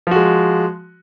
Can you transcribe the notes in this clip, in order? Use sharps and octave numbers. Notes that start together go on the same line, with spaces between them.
F3 G#3 F#4